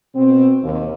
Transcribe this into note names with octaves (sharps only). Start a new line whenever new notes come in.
B2 C4
D#2